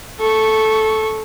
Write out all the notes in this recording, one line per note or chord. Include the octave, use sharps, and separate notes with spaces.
A4 C#6